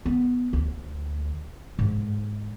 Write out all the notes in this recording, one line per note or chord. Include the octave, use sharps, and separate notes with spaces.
B3
D2
G#2